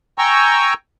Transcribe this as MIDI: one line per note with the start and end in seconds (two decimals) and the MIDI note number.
0.18 0.74 79
0.18 0.74 80
0.18 0.74 82
0.18 0.74 85
0.18 0.74 88